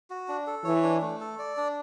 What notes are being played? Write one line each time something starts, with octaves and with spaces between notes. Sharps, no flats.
F#4
D4
A4
E3 C#5
D4
A3
A4
D5
D4